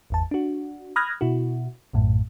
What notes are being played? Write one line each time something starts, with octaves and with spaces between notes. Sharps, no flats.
G#1 E2 A5
D4 F#4
B5 D#6 F6 F#6 G#6 A#6
B2 E4 F#4
A#1 F#2 A2